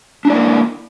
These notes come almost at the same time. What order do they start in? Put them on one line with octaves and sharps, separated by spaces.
D4 E4 D5 A#3 A#4